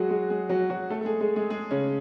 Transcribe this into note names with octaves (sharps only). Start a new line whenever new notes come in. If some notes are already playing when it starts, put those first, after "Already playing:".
Already playing: F#3 G#3 F#4 G#4
G#3 G#4
G#3 G#4
F#3 F#4
F#3 F#4
A3 A4
A4
G#3 G#4
G#3 G#4
G#3 G#4
G#3 G#4
C#3 C#4